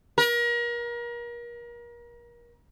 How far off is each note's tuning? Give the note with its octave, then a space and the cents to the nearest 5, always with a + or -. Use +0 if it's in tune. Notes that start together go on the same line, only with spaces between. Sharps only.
A#4 +35